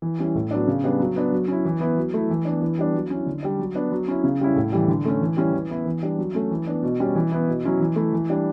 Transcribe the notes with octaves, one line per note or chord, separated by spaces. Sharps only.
E3
G3 C#4 E4
A2
F#3 B3 D4
C#3
G3 B3 D4
F#3
B3 D4
F#3
C#4 E4
E3
B3 E4
F#3
A3 E4
E3
B3 D4
E3
G3 B3 D4
F#3
C#4 E4
D3
G3 D4
F#3
B3 D4
F#3
C#4 E4
C#3
G3 C#4 E4
A2
E3 G3
D3
A3 C#4
E3
G3 C#4 E4
E3
B3 E4
E3
G3 D4
F#3
A3 C#4
E3
B3 D4
B2
G3 C#4
E3
B3 E4
B2
F#3 C#4 E4
E3
A3 E4
E3
G3 D4